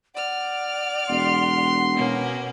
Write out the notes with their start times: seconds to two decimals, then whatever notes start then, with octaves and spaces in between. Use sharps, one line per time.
0.15 D5 F#5 F6
1.09 E1 C6
1.95 B2 A#3 C#4